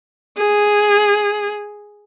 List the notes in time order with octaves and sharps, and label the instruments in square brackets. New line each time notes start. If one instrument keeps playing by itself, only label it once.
[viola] G#4